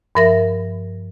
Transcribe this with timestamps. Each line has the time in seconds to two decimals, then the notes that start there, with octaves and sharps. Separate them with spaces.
0.15 G2 F3 A#4 E5 A#6